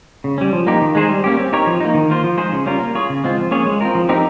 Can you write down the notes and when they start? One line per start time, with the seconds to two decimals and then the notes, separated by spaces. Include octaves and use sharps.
0.24 C#3
0.38 G3 C#4
0.53 F3
0.67 A#3 D#4 G4
0.82 D#3
0.95 G#3 D#4 G#4 C5
1.09 G3
1.24 A#3 C#4 G4
1.38 C4
1.53 D#4 G4 A#4 C#5
1.67 F3
1.81 A#3 D#4
1.94 D#3
2.10 A#3 F4 C5
2.24 F3
2.37 G#3 D#4 G#4 C5
2.52 C#3
2.66 G3 C#4 F4 A#4
2.80 A#3
2.95 F4 G#4 C#5
3.10 C#3
3.24 G#3 C4 F4
3.38 F3
3.51 A#3 C#4 G#4 C#5
3.66 G#3
3.81 C4 F4 A#4
3.95 F3
4.09 C4 D#4 G4 A#4